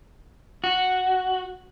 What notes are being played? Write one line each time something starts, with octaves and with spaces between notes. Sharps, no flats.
F#4